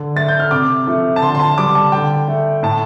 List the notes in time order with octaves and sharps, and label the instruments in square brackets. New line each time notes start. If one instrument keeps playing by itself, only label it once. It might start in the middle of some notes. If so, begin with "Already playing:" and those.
Already playing: [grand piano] D3
A3 A6
G6
F6
C3 D6
F3 A3
A5
D3 C6
C6
A5
G3 D6
A5
D3 G5
A3
A2 A5